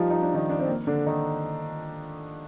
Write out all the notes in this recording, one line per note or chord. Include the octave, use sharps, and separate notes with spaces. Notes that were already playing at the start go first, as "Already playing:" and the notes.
Already playing: F3 G3 D#4 F4 G4
D#4
D4
D#3 D#4
D4
C4
A#3
D3 D4
D#3 D#4